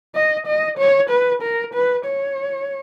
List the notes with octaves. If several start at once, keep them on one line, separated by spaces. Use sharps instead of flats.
D#5
D#5
C#5
B4
A#4
B4
C#5